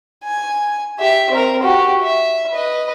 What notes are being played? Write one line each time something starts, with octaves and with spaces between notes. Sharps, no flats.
G#5
G4 E5
C4 A#4
F#4 G4
E5
B4 D#5